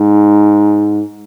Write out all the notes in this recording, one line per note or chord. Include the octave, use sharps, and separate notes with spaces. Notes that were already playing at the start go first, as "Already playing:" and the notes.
Already playing: G#2